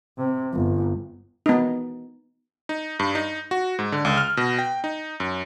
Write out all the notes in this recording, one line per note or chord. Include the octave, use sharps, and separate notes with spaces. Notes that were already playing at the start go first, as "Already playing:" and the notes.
C3
G1
B3 D#4
D#4
G2
D#4
F#4
G#2
D3
C#2
F6
B2
G5
D#4
F#2